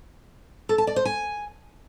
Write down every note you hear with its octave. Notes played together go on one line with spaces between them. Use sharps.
A4
A5
D5
C5
G#5